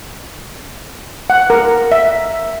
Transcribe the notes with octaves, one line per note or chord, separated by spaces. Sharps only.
F#5
A#4
E5